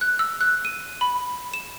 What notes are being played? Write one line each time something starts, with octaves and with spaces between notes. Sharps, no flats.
F#6
E6
F#6
D#7
B5
E7